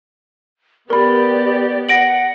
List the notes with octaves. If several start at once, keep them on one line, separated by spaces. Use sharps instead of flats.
B3 G4 A#4 D5 B5
F#5 A#6 D7 F#7